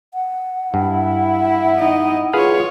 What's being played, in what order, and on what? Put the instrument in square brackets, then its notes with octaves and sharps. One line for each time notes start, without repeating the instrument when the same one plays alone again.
[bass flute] F#5
[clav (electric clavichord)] G2 [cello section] E4
[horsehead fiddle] E5
D#4 D#5
[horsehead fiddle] F4 C#5 [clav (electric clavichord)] G#4 B4 F5